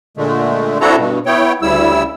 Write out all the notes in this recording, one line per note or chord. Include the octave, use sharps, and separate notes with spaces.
A#2 D3 G#3 A3
C4 D4 E4 F#4 A4 A#5
G2 B2
B3 E4 C#5 G5
D2 C#3 G3 E4 E6